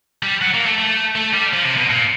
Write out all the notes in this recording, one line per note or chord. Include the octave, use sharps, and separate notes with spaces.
G3
F#3
A#3
A3
A3
A3
G3
F3
C3
B2
A#2